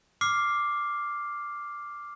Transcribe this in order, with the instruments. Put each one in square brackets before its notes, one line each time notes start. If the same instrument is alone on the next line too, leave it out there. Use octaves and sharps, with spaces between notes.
[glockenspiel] D6 F6 C7